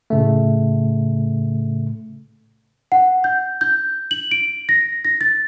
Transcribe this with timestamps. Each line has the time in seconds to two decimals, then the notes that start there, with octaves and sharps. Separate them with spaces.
0.10 A2 C#3 A3
2.92 F#5
3.24 G6
3.61 G6
4.11 F#7
4.31 D7
4.69 A#6
5.05 A#6
5.21 A6